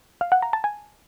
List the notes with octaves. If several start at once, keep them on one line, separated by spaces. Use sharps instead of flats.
F5
F#5
A#5
A5
G#5